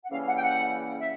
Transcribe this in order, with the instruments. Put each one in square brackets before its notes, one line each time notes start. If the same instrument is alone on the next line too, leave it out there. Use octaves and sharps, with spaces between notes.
[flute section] F#5
[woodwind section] C#3 E3 G3 A#3 C#4 [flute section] F5
[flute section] F#5
G5
F#5
E5